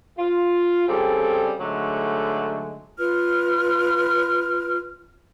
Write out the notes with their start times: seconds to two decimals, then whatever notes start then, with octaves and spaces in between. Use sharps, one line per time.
0.19 F4
0.88 C#3 G3 C4 G#4 A4
1.60 G#2 D3 F#3 G#3 A3
2.99 F4 B4 F6